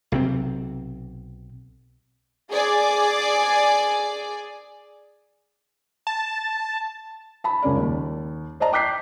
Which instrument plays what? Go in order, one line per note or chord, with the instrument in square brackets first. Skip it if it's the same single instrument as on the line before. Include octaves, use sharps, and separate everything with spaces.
[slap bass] B1 C3 C4
[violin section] G#4 D5
[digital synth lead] A5
[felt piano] A5 B5
C#2 C#3 C#4 A#4 D5
D#2
C5 D5 D#5 A5 A#5
G5 D6 F#6 G6 B6 C7